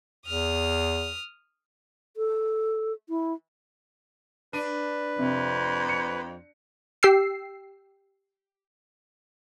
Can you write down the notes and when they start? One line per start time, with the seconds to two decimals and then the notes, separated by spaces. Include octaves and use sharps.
0.26 E2 D#6 F6
2.17 A4
3.09 E4
4.53 D4 B4 D#7
5.19 F2 C3
5.89 C#7
7.03 G4 G5 E6 C7